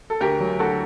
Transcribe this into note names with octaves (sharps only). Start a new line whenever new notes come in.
A4
D2 G4 A#4
F#3
D2 F#4 A4